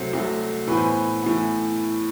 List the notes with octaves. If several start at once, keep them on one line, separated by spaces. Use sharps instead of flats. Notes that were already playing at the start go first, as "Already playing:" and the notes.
Already playing: C2 C3 F#3 A3 C5
C2 C3 F#3 A3
A2 E3 B3 B4
C5
B4
A2 E3 B3